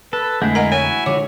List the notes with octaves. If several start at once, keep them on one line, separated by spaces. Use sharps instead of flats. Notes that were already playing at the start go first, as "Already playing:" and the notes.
A4 B4
F2 D3 G#3 A3 E4 G#4
A#4 D#5 F#5 A#5
E4 F#4 C#5 G#5
D3 F3 G#3 C#5 D6